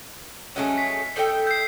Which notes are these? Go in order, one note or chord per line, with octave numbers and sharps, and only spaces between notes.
F#3 G#3 A3 C#4
B6
D#4 A4 G5
G6 C7